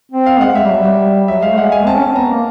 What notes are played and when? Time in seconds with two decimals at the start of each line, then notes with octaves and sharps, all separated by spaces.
0.12 C4
0.26 F5
0.40 G#3 F#5
0.55 G#3 E5
0.64 G3
0.71 F#3
0.79 G3
1.28 F#3 E5
1.42 G#3 F5
1.51 A3
1.58 G#3 F#5
1.72 G#5
1.86 C4 A5
1.97 C#4
2.06 C4
2.16 B3 A#5
2.31 A#3